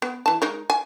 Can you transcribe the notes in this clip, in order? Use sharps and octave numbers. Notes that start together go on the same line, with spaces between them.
B3
E3 A5
G#3 D#4 A#4
G#5